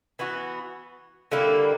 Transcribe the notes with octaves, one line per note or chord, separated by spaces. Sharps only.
E3 B3 F#4
D3 G3 A#3 E4